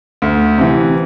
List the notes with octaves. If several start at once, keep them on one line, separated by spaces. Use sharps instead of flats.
D2
C3 E3